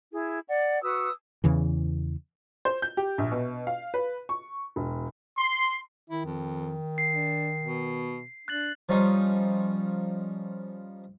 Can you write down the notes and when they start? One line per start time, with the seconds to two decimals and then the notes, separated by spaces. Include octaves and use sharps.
0.13 E4 G#4
0.48 D5 F#5
0.82 F#4 B4 D#6 E6
1.44 E2 C#3 E3
2.65 C5
2.82 G6
2.97 G4
3.18 A#1
3.32 B2
3.67 F5
3.94 B4
4.29 C#6
4.76 E1
5.38 C6
6.10 D#3 E4
6.25 F2
6.98 C7
7.12 D4
7.62 B2
8.48 D4 F#6 A6 F#7
8.89 F3 G3 C#4 D#4 F4